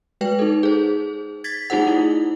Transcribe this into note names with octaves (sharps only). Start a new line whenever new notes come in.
G#3 B4 G5
D#4 A4
G#4 C5
G#6 A6 B6
A3 D#4 F4 G#4 C5 F#5
E4